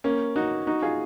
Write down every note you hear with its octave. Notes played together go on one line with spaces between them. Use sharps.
A#3 C#4
D#4 F#4
D#4 F#4
F4 G#4